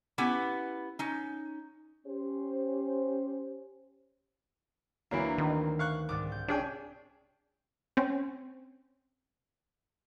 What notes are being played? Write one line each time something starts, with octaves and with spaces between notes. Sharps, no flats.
B3 C#4 E4 G4 B4
C#4 D#4
C#4 G4 C5
D2 E3 F#3 A#3 B4 D7
D#3 C4
F5 C#6 F#6
C2 G#2 D6 A6
G6
C#4 D4 G#4 G5
C4 C#4